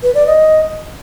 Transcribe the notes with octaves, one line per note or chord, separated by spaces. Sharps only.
B4
D5
D#5